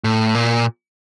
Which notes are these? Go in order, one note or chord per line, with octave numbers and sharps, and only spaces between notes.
A2
A#2